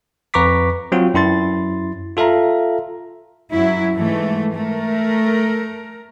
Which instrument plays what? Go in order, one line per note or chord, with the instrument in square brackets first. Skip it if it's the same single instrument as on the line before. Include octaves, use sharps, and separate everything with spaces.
[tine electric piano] F2 B4 A#5 C#6 D6 B6
F#3 C4 F4 F#4
F#2 E4 C6 A6
F4 A4 E5 F5 A#5
[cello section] F#2 F#3 E4
G#2 E3 A3
A3 A#4